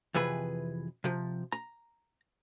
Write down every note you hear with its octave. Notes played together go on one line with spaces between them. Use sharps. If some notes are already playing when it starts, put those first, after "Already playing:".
F2 C3 E3 G#4 B4
C3 F3
A#5